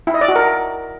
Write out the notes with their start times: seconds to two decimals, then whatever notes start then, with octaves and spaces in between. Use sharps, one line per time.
0.07 E4
0.14 D#5
0.21 D5
0.28 F#4
0.36 A#4